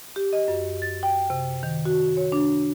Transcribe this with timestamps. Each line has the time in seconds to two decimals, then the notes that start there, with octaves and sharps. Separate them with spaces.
0.16 G4
0.33 D#5
0.48 F#2
0.82 A6
1.03 G5
1.30 C3
1.63 D#3
1.86 F#4
2.17 C#5
2.32 D4